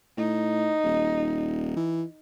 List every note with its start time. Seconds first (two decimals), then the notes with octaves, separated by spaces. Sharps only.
0.17 A2 D#4
0.84 D#1
1.76 E3